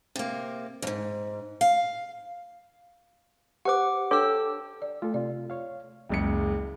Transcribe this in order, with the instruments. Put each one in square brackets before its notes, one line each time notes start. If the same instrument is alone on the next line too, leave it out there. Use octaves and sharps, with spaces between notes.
[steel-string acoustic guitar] C3 A#3
F2 G#2
F5
[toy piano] G4 C5 [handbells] F#5 D6
[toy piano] D4 C#5 D6 [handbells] A4 G5 E6
[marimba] D5
[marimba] A3 [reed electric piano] F4 A4
[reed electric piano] C3 F4 [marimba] D5
[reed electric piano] C#5 F5
[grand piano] F#1 C#2 C#7